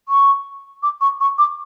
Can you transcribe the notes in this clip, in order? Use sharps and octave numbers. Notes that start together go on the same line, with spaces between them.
C#6
D6
C#6
C#6
D6